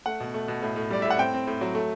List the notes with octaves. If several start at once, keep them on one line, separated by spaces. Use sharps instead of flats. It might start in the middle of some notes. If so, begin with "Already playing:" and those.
A3 F#5
B2
A3
B2
A2
A2
G3 D5
A2 E5
F#5
C4 G5
C4
A2
F#3
A3